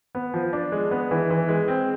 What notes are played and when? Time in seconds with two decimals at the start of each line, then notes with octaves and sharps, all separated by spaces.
0.15 B3
0.34 F3
0.53 D4
0.72 G#3
0.91 B3
1.11 E3
1.30 E3
1.48 G#3
1.68 C4